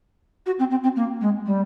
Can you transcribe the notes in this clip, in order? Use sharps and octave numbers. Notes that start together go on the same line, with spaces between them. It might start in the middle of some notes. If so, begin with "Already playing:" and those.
F#4
C4
C4
C4
A#3
G#3
G3